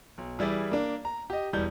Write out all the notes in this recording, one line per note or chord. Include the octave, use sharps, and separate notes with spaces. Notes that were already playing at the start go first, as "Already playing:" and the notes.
B1
E3 G3 E4 G#4 D5
A#3 D4
A#5
G4 D#5
E1 E3 G3 G6